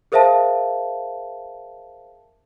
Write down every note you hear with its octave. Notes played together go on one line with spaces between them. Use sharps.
G#4 A#4 C5 E5 F5 A5